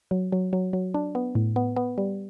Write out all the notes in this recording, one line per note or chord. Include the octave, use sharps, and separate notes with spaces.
F#3
F#3
F#3
F#3
D4
B3
A2
B3
B3
G3